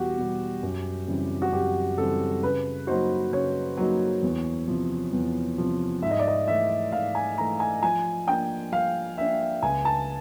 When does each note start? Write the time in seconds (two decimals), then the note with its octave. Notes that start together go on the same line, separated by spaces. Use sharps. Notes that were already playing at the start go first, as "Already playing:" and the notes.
Already playing: E2 B2 G3 F#4 G4
0.18 B2 G3
0.63 F#2
1.08 C#3 E3 G3 C4
1.42 F#4
1.53 F#2 G4
1.97 C#3 E3 G3 C4 A4
2.42 C#3 B4
2.87 F#3 A#3 D#4 F#4 C5
3.32 C#3 C#5
3.77 F#3 A#3 D#4 F#4
4.23 E2
4.68 C3 F3
5.13 E2
5.58 C3 F3
6.02 G#2 E5
6.11 D#5
6.19 D5
6.27 D#5
6.48 E3 A3 E5
6.92 G#2 F5
7.15 G#5
7.38 E3 A3 A#5
7.60 G#5
7.82 F3 G#5
8.27 A#3 D4 G5
8.72 F3 F5
9.18 A#3 D4 E5
9.62 C#2 G#5
9.85 A5